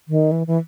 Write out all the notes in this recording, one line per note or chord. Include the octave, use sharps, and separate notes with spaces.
D#3
E3
E3